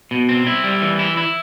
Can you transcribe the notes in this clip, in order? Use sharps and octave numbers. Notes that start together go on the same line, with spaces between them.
B2
C4
E4
G3
E3
E4
E4